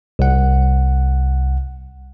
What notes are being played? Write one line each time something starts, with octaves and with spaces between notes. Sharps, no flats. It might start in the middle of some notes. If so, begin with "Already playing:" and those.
C2 F#5